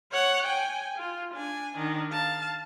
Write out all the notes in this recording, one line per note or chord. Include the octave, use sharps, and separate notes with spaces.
C#5 F#5
G5 G#5
F4
D4 G#5
D#3 D4
F5 A5